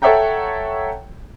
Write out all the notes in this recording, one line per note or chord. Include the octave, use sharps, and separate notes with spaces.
A4 C#5 E5 F#5 G5 A#5